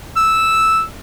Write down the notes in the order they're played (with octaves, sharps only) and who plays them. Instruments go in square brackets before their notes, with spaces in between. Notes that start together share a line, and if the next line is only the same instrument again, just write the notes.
[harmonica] E6